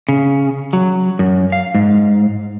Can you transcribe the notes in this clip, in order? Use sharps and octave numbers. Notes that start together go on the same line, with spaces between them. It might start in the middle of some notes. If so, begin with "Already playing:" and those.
C#3
F#3
F#2
F5
G#2